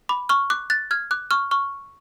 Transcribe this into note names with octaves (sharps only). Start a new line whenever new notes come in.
B5 D6
C#6 F6
D6 F#6
F#6 A6
F6 G#6
D6 F#6
C#6 F6
C#6 F6